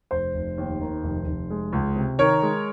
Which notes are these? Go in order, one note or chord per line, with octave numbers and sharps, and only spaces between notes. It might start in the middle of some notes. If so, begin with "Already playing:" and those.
F1 C5
F1
D#2
D#3
F1
F1
G#3
C#2
C3
D#3 A#4 C#5
G#3